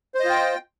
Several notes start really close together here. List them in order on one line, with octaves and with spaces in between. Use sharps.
C5 D#5 F4 G5